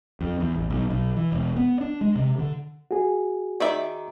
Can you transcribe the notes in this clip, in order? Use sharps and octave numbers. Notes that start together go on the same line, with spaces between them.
F2
E2
A1
B1
B1
E3
E1
B3
D4
G#3
C3
D3
F#4 G#4
D#3 D5 E5